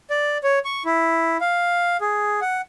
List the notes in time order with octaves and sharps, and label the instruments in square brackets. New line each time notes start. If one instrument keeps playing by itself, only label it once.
[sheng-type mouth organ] D5
C#5
C#6
E4
F5
G#4
F#5